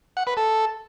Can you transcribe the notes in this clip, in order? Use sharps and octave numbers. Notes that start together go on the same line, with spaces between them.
F#5
B4
A4